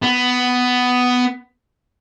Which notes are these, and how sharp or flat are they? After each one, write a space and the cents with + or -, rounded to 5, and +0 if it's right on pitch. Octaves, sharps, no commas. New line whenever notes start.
B3 +10